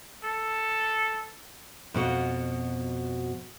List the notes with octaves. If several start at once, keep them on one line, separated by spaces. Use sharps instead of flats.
A4
F2 B2 F#4